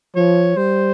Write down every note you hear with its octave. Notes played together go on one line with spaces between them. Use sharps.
F3 C#5
G3 C5